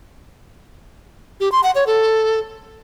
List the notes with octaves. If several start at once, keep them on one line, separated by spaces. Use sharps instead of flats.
G4
C6
F#5
C#5
A4